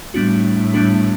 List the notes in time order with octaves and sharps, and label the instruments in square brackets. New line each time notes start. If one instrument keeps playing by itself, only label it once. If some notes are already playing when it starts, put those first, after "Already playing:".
[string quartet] A2 [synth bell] G3 B3 D4 F#4
[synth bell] G3 B3 D4 F#4